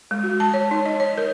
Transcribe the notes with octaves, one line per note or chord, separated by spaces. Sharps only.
G#3
F#4
A5
C#5
D#4
D#5
C#5
A#4